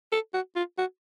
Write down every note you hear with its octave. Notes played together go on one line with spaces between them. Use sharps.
A4
F#4
F4
F#4